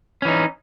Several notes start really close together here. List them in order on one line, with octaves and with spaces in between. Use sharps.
C#4 E3 D#4